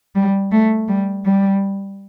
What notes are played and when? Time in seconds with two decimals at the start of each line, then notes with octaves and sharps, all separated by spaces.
0.15 G3
0.52 A3
0.89 G3
1.25 G3